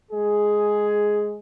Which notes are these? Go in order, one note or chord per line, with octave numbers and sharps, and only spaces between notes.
G#3 G#4